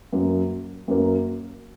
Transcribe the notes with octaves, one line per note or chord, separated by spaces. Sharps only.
F#2 F#3 A#3
F#2 F#3 A#3